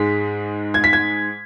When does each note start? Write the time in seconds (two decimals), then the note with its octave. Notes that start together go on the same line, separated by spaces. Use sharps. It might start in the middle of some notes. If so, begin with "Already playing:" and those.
Already playing: G#2 G#3 B6
0.74 G#6
0.84 B6
0.93 G#6